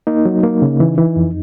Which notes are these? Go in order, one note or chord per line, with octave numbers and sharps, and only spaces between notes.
A#3 D#4
F#3
A#3
C#3
E3
E3
F2